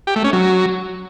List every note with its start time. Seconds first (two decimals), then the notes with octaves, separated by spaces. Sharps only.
0.07 G4
0.16 A3
0.24 C#4
0.33 F#3